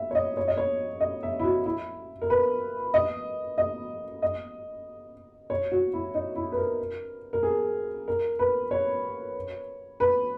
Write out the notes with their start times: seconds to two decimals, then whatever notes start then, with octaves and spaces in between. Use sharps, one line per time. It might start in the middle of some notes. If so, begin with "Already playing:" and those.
Already playing: E5
0.11 C#5
0.15 D#5
0.37 C#5
0.48 D#5
0.57 C#5
1.00 D#5
1.23 E5
1.39 E4
1.44 F#4
1.66 E4
2.22 A#4
2.30 B4
2.94 D#5
3.58 D#5
4.22 D#5
5.50 C#5
5.72 F#4
5.93 E4
6.15 D#4
6.36 E4
6.52 B4
6.57 A#4
7.33 A#4
7.43 G#4
8.08 A#4
8.39 B4
8.71 C#5
10.00 B4